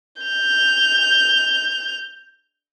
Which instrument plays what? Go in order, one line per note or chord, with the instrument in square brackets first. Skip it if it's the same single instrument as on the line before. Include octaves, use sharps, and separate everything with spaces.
[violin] G6 F7